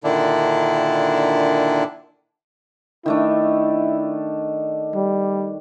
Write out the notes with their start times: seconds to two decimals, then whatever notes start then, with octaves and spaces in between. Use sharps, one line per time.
0.04 A#2 D3 D#3 D4 E4
3.06 D#3 A3 D4 E4
4.95 G3